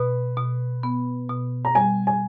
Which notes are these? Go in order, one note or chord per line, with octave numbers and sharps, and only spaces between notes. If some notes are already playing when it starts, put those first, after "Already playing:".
Already playing: B2 B4
B2
B3
B2
A#5
G3 G#5
G#5